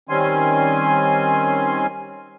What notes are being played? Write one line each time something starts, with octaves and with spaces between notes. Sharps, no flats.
D#3 G3 C4 C#4 G#5 C6